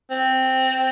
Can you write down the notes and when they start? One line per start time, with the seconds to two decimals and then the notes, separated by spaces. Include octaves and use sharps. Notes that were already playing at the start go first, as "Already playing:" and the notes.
0.11 C4